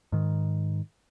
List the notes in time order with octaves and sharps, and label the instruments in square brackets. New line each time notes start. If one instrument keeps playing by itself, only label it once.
[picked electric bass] G#2 D#3